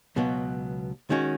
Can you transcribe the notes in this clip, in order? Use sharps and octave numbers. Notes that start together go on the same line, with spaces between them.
C#2 B2 F#3 B3
D#3 G#3 C#4 F#4